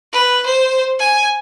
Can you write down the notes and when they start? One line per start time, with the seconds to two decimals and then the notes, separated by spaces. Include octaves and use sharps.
0.13 B4
0.46 C5
1.00 G#5